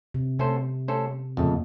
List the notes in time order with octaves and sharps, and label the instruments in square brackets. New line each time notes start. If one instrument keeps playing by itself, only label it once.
[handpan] C3
[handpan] C3 [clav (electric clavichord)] A3 C#4 A4 C5
[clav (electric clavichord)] A3 C#4 A4 C5
[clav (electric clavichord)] F2 C#3 A3 [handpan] A#2